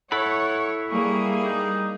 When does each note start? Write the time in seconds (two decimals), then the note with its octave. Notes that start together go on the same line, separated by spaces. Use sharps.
0.12 E4 A4 C#5 F#5 B5
0.90 G3 A#3 G#4 C#6
1.45 D#4